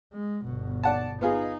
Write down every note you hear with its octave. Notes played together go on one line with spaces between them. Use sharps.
G#3
G1 B2
D5 F#5 A5
B3 D#4 F4 G#4